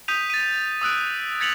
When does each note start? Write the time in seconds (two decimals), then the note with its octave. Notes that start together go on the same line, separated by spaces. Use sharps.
0.08 D#6 G6 B6 D#7 F7
0.30 A6 D#7
0.82 D#6 E6 F#6 D7
1.40 G#6 A6 B6 C#7 F7 F#7